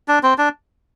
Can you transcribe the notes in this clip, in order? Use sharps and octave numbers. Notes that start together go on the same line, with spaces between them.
D4
C4
D4